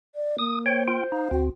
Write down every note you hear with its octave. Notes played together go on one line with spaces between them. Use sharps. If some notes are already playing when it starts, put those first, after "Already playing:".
D5
A#3 D#6
C5 C#5 G5
F4 G5
D#4 F5
D2 C4 F#4